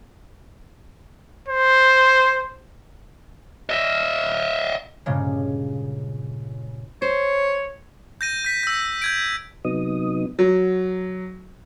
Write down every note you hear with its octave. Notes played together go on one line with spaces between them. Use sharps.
C5
D#5 E5
G2 A#2 C#3 G#3
C5 C#5
G6 A#6 D#7
G6 B6
E6 G6
G6 G#6 D7
C3 F#3 B3 D#4 D#6
F#3